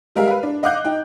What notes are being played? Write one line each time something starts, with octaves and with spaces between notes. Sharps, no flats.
G3 G#3 A#4 E5 F5
B4 F5
D4
D#5 F5 F#5 D6 F#6 G6
D#4 G5